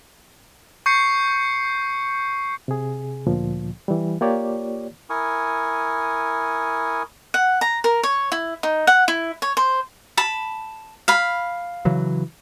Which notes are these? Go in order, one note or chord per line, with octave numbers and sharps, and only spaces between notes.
C#6 G6 C7 C#7
C3 G#4
D2 A#2 F3
E3 G3
A#3 F4 G4 C#5 D5
E4 A#4 G#5 C#6 D#6
F#5
A#5
A#4
C#5
E4
D#4
F#5
E4
C#5
C5
A5 B5
F5 B5
C#3 E3 F#3